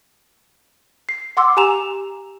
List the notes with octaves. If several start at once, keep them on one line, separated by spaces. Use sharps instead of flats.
C7
F#5 C6 D6 E6
G4 G#5 A#5 E7 F7